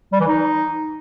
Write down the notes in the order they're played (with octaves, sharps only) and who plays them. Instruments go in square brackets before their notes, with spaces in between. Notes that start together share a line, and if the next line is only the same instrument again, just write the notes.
[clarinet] G3
E3
D#4